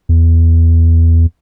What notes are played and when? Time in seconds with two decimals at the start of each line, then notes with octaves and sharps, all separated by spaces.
0.09 E2